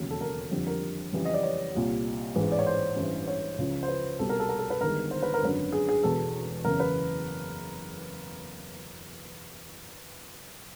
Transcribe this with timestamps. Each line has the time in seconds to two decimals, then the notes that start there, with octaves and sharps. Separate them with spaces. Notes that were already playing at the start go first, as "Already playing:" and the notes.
Already playing: E1 D#2 C#3 F#3
0.10 A4
0.21 A#4
0.51 F2 D3 G3
0.67 A#4
1.13 F2 C#3 E3 G3
1.25 D#5
1.34 D5
1.43 C#5
1.74 C2 A#2 G3
2.35 A1 G#2 E3 G#3
2.52 D5
2.59 C#5
2.67 C5
2.97 A1 G2 E3
3.28 C#5
3.58 C#2 C#3 F3
3.83 C5
3.88 B4
4.19 C2 B2 G3 A4
4.29 A#4
4.40 A4
4.49 A#4
4.59 A4
4.70 B4
4.81 G1 G2 D#3 G#3 A#4
5.11 C5
5.22 B4
5.34 A#4
5.42 G#1 F#2 D3 B4
5.72 G#4
5.89 G#4
6.03 E1 E2 B2 G#3 A4
6.65 F#1 E2 C#3 E3 A#4
6.80 B4